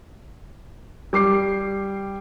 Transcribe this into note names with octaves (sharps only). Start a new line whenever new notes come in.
G3 D6 C7